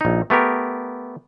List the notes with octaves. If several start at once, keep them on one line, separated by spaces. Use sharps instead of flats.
A#1 D#4
A3 B3 G4 A#4